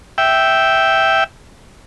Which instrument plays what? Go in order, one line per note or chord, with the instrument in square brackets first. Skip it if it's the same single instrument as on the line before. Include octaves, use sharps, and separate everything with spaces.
[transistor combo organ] E5 G5